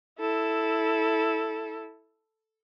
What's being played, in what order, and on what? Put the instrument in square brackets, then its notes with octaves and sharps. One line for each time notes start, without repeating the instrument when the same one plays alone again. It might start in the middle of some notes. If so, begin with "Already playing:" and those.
[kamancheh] E4 A4